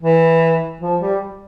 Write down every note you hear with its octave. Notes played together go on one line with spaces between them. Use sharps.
E3
F3
G3